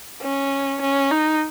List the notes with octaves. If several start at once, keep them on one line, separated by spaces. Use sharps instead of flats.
C#4
C#4
D#4